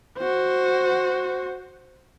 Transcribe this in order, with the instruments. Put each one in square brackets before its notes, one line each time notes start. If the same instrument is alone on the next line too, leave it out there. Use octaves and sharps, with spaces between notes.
[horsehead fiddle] F#4 C5